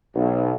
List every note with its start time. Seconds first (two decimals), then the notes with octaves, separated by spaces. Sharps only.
0.15 B1